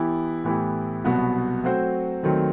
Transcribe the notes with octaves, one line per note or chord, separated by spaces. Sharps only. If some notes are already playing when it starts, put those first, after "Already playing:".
Already playing: E3 B3 E4 G4
A2 E3 B3 E4 G4
C2 B2 F#3 B3 F#4
F#3 A3 C4 F#4 C5
D#2 D#3 F#3 A3 C4